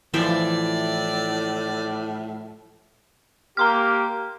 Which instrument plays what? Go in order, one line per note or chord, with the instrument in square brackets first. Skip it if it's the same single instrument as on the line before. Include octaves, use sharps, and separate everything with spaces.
[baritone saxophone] A2 [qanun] E3 E5 G5 [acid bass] F3 [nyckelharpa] D5
[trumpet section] A#3 G4 [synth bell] A#5 C6 F6